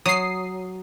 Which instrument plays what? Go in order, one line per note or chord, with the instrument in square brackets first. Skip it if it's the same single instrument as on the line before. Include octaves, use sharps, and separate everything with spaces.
[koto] F#3 [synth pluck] D#6 C7